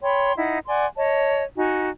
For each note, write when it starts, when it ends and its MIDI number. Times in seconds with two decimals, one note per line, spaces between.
0.03 0.33 73
0.03 0.33 79
0.03 0.33 83
0.03 0.33 84
0.37 0.59 63
0.37 0.59 64
0.37 0.59 78
0.67 0.86 74
0.67 0.86 78
0.67 0.86 80
0.67 0.86 84
0.96 1.44 73
0.96 1.44 75
0.96 1.44 81
1.56 1.89 63
1.56 1.89 66
1.56 1.89 80